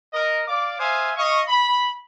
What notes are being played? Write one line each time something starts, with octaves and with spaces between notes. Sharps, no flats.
A#4 D#5
D5 F5 D6
C5 E5 F5 G#5 D#6
D#5 F5 C#6
B5